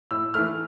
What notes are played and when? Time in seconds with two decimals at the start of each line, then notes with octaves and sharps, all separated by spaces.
0.11 A2 E6
0.34 E3 A3 F6